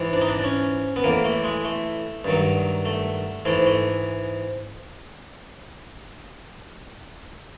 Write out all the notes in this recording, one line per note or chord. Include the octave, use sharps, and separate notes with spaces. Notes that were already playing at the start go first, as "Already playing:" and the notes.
Already playing: G#2 E3
D4
D#4
D4
D4
C#4
B3
A2 E3 A#3
A3
G#3
A3
G2 D#3 F#3
A3
G#2 E3 A3
A3